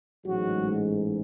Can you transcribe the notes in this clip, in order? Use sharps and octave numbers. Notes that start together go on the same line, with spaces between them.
A1 G#2 F#3 G#3 F#4